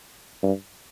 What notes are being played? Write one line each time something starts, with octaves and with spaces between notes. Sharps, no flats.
G2